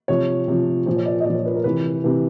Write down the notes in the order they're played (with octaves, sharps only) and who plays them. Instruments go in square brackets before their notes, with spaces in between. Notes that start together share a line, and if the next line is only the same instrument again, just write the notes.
[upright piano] C3 F3 C#5
C3 F3
A#2 F3 C5
C#5
D5
D#5
A#2 F3 D5
C#5
B4
A#4
C3 E3 B4
C3 E3